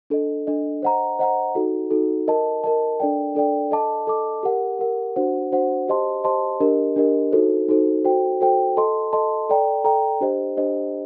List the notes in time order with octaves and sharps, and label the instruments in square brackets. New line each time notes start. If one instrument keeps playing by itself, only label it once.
[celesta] D4 A4 D#5
D4 A4 D#5
C5 D#5 F#5 A#5
C5 D#5 F#5 A#5
D#4 F#4 A4
D#4 F#4 A4
A#4 D#5 A5
A#4 D#5 A5
D4 A4 D5 G5
D4 A4 D5 G5
A4 D#5 A5 D6
A4 D#5 A5 D6
G4 A#4 F#5
G4 A#4 F#5
D4 F#4 C5 F#5
D4 F#4 C5 F#5
G4 C5 D#5 A5 C6
G4 C5 D#5 A5 C6
D4 G4 A#4 D#5
D4 G4 A#4 D#5
D#4 F#4 A4 C5
D#4 F#4 A4 C5
F#4 A4 C5 G5
F#4 A4 C5 G5
A4 D#5 A5 C6
A4 D#5 A5 C6
A4 D5 G5 A#5
A4 D5 G5 A#5
D4 G4 C5 D#5
D4 G4 C5 D#5